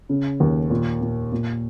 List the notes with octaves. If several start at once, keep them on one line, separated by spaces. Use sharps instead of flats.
C#3
D#2
A#2
A#2
A#2